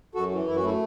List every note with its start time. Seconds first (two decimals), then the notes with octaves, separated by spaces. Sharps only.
0.15 F#2 F#4 A4
0.32 E3
0.47 F#2 E4
0.56 F#4
0.63 A3 E4